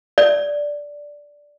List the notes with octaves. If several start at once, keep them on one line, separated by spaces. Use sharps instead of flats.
D5